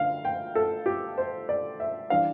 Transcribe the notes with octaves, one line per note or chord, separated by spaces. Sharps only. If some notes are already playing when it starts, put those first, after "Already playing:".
Already playing: D3 D4 F5
G5
A4
G4
C5
D5
E5
E3 G3 D4 F5